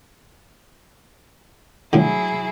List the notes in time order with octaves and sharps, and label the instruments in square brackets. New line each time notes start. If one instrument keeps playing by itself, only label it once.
[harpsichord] A2 D3 [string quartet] F#3 E4 G#4